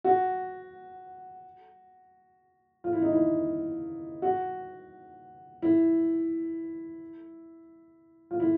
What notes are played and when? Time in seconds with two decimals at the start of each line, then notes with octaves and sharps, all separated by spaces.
0.04 F#4
2.84 F4
2.93 E4
3.02 D#4
3.13 E4
4.22 F#4
5.62 E4
8.31 F4
8.40 E4